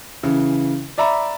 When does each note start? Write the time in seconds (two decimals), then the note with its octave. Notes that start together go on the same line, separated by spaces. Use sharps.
0.23 C#3 E3
0.98 D5 E5 A#5 B5